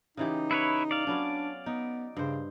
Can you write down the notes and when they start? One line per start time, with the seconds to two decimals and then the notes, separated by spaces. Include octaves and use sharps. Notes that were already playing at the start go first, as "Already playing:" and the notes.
0.17 C#3 E3 D#4 G4
0.51 E4 B4 C#5
0.91 D5 F5
1.07 F#3 B3 C#4 D4
1.66 B3 D#4
2.17 G2 C#3 C5